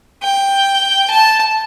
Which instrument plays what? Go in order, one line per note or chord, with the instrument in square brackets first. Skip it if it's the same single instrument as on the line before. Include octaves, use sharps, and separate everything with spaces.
[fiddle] G5
A5